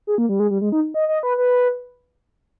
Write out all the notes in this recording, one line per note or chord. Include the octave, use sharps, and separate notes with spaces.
G#4
A#3
G3
G#3
G3
G#3
D#4
D#5
D#5
B4
B4